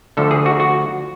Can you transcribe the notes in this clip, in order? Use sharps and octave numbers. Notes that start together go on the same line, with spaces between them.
D2 D3 F3 A4
G#4
F#4
F#4